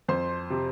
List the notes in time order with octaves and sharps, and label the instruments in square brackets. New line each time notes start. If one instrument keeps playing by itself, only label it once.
[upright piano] F2 C5 C6
C3